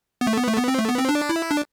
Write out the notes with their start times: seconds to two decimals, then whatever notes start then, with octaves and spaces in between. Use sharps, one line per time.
0.21 B3
0.27 A3
0.37 B3
0.47 A3
0.57 B3
0.68 C4
0.79 A3
0.89 B3
0.98 C4
1.09 D4
1.29 E4
1.51 D4